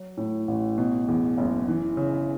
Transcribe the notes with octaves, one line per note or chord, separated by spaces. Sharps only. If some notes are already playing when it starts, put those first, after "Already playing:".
Already playing: F#3
A2
A1
B2
E2
F#1
E3
C#3